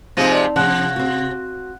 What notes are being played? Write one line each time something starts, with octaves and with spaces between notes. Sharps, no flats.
C3 F3 G#3 C4 D#4 A#6 D#7
D5 A5
C3 F3 D4 F#5 F#6
C4 F#4